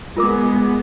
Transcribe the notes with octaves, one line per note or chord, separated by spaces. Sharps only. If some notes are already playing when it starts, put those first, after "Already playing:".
G#3 B3 F4 A#4 D6